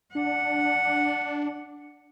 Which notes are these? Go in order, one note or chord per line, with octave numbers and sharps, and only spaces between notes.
D4 F#5